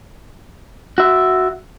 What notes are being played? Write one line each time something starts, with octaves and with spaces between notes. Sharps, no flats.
F#4 E5